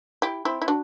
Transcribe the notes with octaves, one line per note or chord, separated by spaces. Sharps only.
E4 G4
C4 E4
E4
D4 F#4